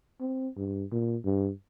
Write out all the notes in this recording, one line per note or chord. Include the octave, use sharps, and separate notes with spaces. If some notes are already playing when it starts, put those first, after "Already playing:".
C4
G2
A#2
G2